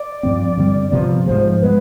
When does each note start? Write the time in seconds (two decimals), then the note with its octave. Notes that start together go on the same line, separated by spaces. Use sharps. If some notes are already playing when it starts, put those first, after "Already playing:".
Already playing: D5
0.23 G2 F3 C4
0.57 G2 D3 G3 C4
0.92 C3 F3 B3
1.26 G#2 F3 G#3 C5
1.61 F3 G#3 B3 B4